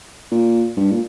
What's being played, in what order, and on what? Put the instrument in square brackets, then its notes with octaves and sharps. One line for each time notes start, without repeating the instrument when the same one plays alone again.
[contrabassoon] A#2
G2
A#2